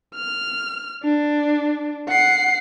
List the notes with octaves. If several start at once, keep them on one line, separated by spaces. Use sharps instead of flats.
F6
D4
F#5 C7